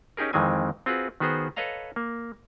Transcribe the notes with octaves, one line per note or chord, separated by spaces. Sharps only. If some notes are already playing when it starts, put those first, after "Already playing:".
C#4 D#4 G4 G#4 A#4
F2 D#3 E3 G#3 C4 G#5
C4 F4 F#4 G#4 B4
D#3 B3 F#4 G#4 C5
A4 B4 C#5 D#5 F5 A#5
A#3